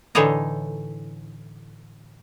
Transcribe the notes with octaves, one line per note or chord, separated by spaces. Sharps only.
A2 D3 E3 D#4 C#5 D#5